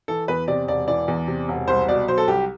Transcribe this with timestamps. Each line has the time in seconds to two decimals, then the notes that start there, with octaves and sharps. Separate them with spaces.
0.08 E3 A4
0.28 E2 B4
0.48 C3 D5
0.68 E1 D5
0.88 E3 D5
1.08 E2
1.28 C3
1.48 E1
1.68 C2 C5
1.88 B2 D5
2.08 F#3 C5
2.18 A4
2.28 C2 G4